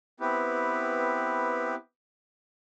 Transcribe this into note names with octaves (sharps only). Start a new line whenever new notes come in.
B3 C4 E4 G4 B4